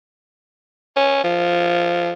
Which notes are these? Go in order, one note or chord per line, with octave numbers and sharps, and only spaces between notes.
C#4
F3